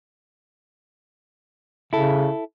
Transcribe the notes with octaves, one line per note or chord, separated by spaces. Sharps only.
C#3 E4 A4